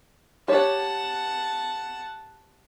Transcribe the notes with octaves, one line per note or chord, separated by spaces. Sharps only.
G4 C#5 F#5 A5